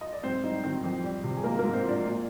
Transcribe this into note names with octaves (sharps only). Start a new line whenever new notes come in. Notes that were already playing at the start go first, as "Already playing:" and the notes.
D#5
D5
G#2 C4 C5
G3 D#4 D#5
D#3 C4 C5
F2
G3
C3
G#4
G#2 A#3 A#4
G#2 A#3 A#4
C4 C5
F3 D4 D5
A#2